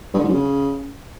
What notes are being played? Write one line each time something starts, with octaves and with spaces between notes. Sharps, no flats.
G2
D3
G#2
F#2
C#3